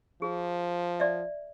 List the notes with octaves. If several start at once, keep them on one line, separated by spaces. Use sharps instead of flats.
F3 G#4
D5 E5